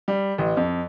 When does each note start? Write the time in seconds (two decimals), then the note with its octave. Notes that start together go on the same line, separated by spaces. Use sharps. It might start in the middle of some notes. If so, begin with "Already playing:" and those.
0.08 G3
0.38 A1
0.57 F2